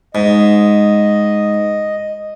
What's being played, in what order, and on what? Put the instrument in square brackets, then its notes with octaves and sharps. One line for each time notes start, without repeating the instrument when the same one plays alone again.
[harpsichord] G#2 [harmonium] D#5